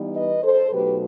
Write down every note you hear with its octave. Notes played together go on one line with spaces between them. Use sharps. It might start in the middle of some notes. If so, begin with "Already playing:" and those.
Already playing: E3 G3 B3 D#4
B4 D#5
A4 C5
B2 F#3 A3 D#4 G4 B4